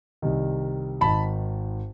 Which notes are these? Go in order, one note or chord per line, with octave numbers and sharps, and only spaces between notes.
C2 C3 D#3
G#1 D#3 A5 B5